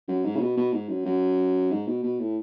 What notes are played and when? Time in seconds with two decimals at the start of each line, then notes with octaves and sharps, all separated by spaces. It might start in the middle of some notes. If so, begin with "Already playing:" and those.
0.08 F#2
0.24 G#2
0.36 C#3
0.41 B2
0.57 B2
0.73 G#2
0.89 F#2
1.05 F#2
1.71 G#2
1.87 B2
2.03 B2
2.19 A2